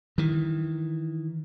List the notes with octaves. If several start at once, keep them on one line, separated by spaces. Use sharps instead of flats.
D#3 E3